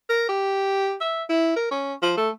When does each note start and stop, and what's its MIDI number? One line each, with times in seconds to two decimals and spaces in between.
0.10 0.26 70
0.29 0.95 67
1.01 1.23 76
1.30 1.53 64
1.56 1.71 70
1.71 1.94 61
2.02 2.14 53
2.17 2.30 57